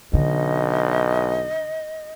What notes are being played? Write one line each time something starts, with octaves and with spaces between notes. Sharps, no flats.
B1 D3 D#5